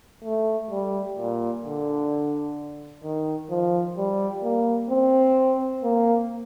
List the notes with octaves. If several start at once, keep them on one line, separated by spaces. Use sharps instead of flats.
A3
G3
A#2
D3
D#3
F3
G3
A#3
C4
A#3